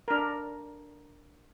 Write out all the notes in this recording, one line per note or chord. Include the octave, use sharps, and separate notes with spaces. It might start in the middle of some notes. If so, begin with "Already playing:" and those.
D4 A#4